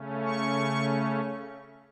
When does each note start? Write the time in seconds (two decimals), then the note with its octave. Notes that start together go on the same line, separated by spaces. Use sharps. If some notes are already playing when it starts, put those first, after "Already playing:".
Already playing: C#3 A3 C#4
0.24 C#6